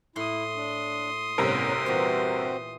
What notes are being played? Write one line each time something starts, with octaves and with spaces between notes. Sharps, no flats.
A2 E4 C6 D#6
D4
G1 A2 C3 B3 C#4 A#4
A#2 E3 C4 F#4 G4 C5